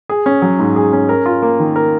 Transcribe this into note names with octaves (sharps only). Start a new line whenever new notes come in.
G#4
C#4
F#3
G#2
G#4
C#4
A#4
F4
A#3
D#3
A#4